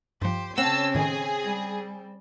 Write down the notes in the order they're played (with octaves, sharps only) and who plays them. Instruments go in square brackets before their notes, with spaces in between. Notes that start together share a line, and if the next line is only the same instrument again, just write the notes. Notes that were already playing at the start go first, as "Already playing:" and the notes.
[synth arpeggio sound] G2 F3 [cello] G4 C5
[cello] C#3 C#4 [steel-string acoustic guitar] C4 [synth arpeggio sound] F#5 [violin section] A5 E6
[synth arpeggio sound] A2 D#3 [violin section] G#4
[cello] G3